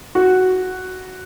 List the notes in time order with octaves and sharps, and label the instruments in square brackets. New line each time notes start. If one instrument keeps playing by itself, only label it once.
[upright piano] F#4